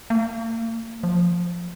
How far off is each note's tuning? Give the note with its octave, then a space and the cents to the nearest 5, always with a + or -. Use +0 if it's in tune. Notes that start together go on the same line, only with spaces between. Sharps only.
A#3 -40
F3 +5